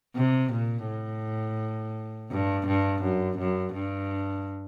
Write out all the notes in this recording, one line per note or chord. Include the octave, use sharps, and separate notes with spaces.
C3
A#2
A2
G2
G2
F#2
F#2
G2